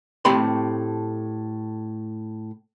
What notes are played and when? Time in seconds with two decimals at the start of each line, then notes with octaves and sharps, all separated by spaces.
0.25 A2 A3 C4 G4 B5 C6